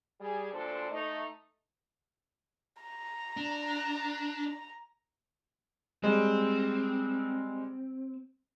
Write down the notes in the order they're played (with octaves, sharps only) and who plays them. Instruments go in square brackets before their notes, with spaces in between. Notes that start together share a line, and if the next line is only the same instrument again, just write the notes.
[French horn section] G3 G#4
D2 A#2 D4 A4 C5
A3 D#4
[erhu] A#5
[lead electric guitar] D4
[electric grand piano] G3 G#3 [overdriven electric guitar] C4